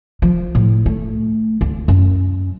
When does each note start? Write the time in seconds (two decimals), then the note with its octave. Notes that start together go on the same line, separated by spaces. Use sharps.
0.22 F3
0.55 A2
0.86 A3
1.61 D2
1.88 F#2